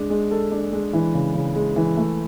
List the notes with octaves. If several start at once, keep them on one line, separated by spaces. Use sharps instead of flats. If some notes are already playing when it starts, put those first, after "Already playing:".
Already playing: G#3 D4
G#3
A4
D4
G#3
E3
C#3
C#3
G#3
E3
A3